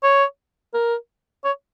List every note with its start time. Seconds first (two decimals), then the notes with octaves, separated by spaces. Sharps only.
0.03 C#5
0.74 A#4
1.44 C#5